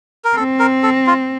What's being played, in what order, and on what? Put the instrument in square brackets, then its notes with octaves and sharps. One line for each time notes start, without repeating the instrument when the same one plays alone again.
[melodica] A#4
[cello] C4 [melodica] A4
[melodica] A#4
A4
F4